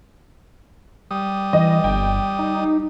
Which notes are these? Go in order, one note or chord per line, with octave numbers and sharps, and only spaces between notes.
G3 D#6
E3 D#5
G1 G5
D#4